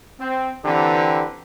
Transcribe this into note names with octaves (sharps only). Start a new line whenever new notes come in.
C4
D3 E3 C4 G4 B4 A#5